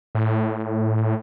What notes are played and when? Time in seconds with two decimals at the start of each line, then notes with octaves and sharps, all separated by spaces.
0.15 A2